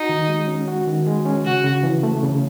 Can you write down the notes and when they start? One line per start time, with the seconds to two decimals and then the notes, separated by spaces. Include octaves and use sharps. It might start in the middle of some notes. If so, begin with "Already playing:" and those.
Already playing: D#4 F#4
0.09 D#3
0.29 G#3
0.47 C#4
0.68 F#4
0.87 D#3
1.07 G#3
1.25 C#4
1.45 C#3 F#4
1.64 C#3
1.83 E3
2.03 A3
2.23 C#3